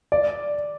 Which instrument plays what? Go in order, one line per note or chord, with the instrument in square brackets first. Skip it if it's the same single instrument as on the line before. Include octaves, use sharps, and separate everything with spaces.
[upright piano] D5